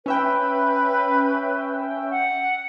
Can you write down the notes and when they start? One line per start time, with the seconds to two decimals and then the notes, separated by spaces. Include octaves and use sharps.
0.06 C#4 B4 E5 G5
2.11 F#5